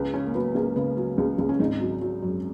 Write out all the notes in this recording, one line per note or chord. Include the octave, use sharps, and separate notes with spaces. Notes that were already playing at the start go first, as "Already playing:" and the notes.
Already playing: C#2 B4
C#3 C#4
A#3
F#3 B3
C#2 A#3
C#3 B3
F#3
C#2
C#2
C#4
G#1 D#4
F#3
F#3
F#2